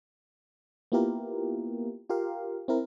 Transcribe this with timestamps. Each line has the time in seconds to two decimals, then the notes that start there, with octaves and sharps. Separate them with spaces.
0.92 A#3 B3 E4 F4 G4 A#4
2.10 F4 G4 A#4 F5
2.68 C4 E4 A#4